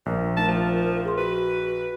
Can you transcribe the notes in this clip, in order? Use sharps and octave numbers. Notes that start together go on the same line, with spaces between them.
A#1 A#4
A3 D#4 A5
F3
G#4 C6
F#4 B4